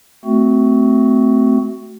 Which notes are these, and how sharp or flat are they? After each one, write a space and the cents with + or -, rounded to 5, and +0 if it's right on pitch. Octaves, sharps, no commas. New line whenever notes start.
A3 +0 C4 -20 F#4 +10